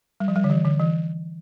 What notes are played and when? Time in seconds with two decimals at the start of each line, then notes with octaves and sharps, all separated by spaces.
0.20 G3
0.28 F3
0.36 G3
0.44 D3
0.50 E3
0.65 D3
0.80 E3